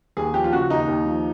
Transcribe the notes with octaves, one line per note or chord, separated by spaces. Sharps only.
D#2 G#4
F3 G4
F4
C#3 F#4
D#2 D#4
D#2
F3